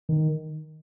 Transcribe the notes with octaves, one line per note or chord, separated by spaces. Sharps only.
D#3